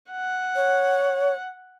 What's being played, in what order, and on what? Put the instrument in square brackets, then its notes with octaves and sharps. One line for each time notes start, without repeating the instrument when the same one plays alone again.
[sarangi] F#5
[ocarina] C#5